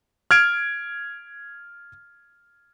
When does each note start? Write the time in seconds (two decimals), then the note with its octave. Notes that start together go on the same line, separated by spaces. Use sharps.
0.31 F6 G#6 D7